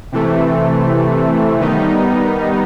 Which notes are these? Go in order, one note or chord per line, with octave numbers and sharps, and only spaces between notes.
C3 E3 A3
D#3 G3 B3 D#4